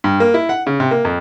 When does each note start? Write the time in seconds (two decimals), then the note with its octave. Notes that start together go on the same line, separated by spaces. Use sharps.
0.04 G2
0.20 A#3
0.34 E4
0.49 F#5
0.67 C#3
0.80 C3
0.91 A#3
1.05 F2